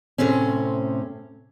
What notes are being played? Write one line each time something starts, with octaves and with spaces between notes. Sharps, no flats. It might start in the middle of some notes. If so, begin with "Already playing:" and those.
A2 C3 C4 C#4